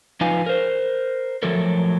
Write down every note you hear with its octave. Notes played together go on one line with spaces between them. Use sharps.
F3 D#4 F4 B4 F5 G#5
A#4 C5
F3 F#3 A3 A4 A#4